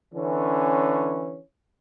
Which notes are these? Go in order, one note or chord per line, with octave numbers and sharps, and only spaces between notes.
D3 E3 C#4